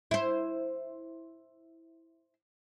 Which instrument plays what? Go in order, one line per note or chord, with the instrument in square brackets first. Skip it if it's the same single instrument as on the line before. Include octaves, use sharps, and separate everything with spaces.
[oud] E4 C5